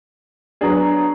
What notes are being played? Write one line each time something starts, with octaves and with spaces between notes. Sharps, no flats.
F#3 B3 D4 G#4